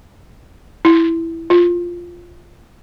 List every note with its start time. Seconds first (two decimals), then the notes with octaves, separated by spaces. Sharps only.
0.85 E4
1.50 F4